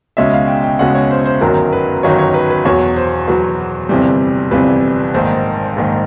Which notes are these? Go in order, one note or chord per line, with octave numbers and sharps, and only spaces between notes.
C#2 B2 G#3 C#4 E5
F5
G5
G5
C#2 B2 G#3 C#4 F#5
C#5
C5
C5
G1 F#2 D#3 F#3 A#4
B4
G1 F#2 D#3 F#3 C#5
C#5
B4
B4
E2 B2 F#3 C#5
C5
E2 B2 F#3 B4
G1 F2 C3 E3 G3
G1 F2 C3 E3 G3 B4
A#1 G#2 D#3 C5
A#1 G#2 D#3